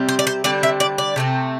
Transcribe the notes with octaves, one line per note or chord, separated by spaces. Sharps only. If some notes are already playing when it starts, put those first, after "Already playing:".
Already playing: C3 G3 C4
C5
D5
C5
D3 G3 C4 D5
E5
D5
D5
C3 A3 C4